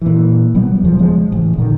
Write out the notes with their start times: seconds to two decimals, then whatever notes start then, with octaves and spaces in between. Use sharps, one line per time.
0.01 A#2 E3
0.54 B2 F#3 G3 B3
0.82 E1 C#3 F3
0.99 C#3 F3 G#3
1.32 A1
1.58 A#2 D3 D#3